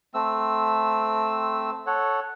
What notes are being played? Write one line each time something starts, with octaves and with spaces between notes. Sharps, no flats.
A3 C4 E6
A4 C#5 F#5